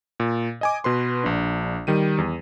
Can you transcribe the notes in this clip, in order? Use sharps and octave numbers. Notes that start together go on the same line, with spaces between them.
A#2
D#5 G#5 D6
B2 B4 C6
A#1 D4
D#3 G3 D#7
E2